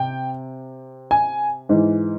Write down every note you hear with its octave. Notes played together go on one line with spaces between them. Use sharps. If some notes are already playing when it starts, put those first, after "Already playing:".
Already playing: C3 G5
G#5
G#2 E3